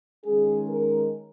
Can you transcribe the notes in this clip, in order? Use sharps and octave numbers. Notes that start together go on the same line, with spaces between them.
D#3 G#3 C#4 G#4
A#4